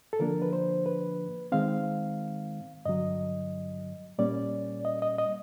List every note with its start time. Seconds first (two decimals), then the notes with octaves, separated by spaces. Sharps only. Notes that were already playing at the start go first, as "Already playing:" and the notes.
0.13 A4
0.20 D3 F3 A#3 D4 A#4
0.42 B4
0.53 C5
0.86 B4
1.52 D#3 G#3 C4 F5
2.86 G2 D3 F#3 D#5
4.18 A#2 G3 A#3 C#4 D5
4.85 D#5
5.02 D#5
5.18 D#5